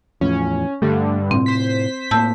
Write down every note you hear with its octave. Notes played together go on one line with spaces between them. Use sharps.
E2 A2 F3 C#4
G2 D3 G3 A3
A2 C3 C4
C5 B6
A2 A#3 A5 E6 G6